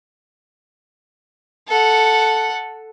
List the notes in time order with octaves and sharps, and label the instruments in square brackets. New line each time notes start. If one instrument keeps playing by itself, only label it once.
[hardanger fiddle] A4 F#5